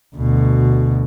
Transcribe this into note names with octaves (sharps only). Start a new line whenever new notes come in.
D2 B2